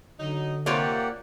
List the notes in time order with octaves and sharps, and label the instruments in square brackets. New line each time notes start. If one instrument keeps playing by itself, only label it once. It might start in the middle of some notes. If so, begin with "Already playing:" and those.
[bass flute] D3 [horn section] F#3 D#4
[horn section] C3 [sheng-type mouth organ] A#3 G4 F#5 [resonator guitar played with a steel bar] F4 C#5 D5